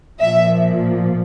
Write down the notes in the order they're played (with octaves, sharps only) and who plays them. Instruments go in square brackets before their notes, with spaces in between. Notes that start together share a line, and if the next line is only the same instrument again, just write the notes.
[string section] A#2 F3 E5